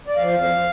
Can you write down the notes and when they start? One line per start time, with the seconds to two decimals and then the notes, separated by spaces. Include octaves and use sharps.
0.07 D5
0.17 F3 F5
0.33 F2